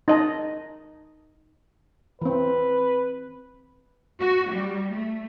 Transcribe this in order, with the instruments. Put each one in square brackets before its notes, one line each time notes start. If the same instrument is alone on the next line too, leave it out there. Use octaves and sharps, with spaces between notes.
[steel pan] D#4 D#5 A5
[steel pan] E3 C4 [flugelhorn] B4
[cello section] F#4
G3
A3